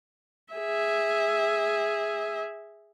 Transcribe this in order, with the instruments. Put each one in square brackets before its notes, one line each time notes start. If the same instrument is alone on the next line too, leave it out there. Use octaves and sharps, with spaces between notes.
[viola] G#4 E5